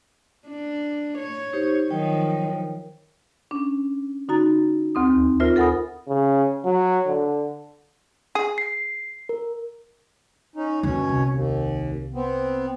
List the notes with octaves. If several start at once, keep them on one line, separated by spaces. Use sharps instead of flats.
D4
C#5
D#4 G4 C5
D#3 F3 F#3 C#5 G5
C#4 D4
D3 D#4 F#4 A#5 A6
D2 C4 D#6
D#2
F4 A#4 C5 E5
A4 A#4 F#5 G#5 B5 D#6
C#3
F#3
D3
G#4
C7
A#4
C#4 D#4
F#2 B2 D3 C#4 C#5
C2
D#2
B3 C4